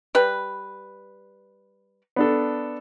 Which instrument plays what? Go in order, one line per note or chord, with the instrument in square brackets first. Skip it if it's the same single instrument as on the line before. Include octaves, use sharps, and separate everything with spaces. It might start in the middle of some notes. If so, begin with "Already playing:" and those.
[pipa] G3 B4
[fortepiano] B3 D4 A4